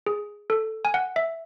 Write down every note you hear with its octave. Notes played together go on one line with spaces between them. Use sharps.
G#4
A4
G#5
F#5
E5